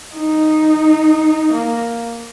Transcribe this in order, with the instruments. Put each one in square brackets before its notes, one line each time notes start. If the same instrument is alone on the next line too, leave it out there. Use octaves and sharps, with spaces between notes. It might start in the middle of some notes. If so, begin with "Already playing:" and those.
[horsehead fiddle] D#4
A#3